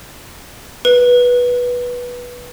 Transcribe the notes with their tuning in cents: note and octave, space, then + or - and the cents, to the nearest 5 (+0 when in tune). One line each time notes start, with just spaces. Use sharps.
B4 -15